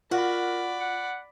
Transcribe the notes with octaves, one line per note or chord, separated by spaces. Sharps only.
F4 F#4 A#4 D5 B5
F#5